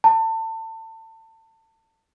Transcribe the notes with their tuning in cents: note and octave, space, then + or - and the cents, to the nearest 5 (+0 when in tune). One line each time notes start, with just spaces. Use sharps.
A5 +30